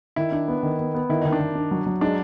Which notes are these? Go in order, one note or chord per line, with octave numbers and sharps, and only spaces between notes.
D#3 E4
D4
B3
D#3
B3
B3
D#3 E4
D#3 D#4
D4
D#3
D4
F#3
F#3
G#3 D4